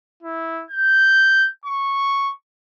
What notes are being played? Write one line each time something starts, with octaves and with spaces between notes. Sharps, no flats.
E4
G6
C#6